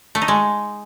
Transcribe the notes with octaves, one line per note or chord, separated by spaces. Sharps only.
A3
D#4
G#3